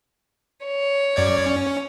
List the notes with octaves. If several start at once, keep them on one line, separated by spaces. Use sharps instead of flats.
C#5
F#2 D5 G#6
C#4